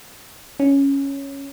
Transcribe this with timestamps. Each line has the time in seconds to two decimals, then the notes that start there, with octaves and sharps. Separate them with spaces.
0.60 C#4